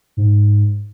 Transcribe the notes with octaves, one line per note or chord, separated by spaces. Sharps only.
G#2